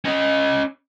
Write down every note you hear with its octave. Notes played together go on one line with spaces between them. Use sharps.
C#4 D#5